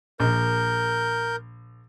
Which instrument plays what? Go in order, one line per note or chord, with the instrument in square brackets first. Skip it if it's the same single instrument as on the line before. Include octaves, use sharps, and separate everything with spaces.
[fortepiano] A#1 [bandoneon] A#4 G6